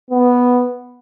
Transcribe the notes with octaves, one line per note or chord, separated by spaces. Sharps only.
B3